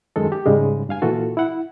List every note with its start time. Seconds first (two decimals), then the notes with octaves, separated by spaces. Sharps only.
0.16 F#2 D#3 G#3 A4
0.32 G4
0.45 G#2 C#3 G3 G#3
0.89 G2 F5 G#5
1.02 A#2 E3 F4 F#4 A4
1.37 E4 F#5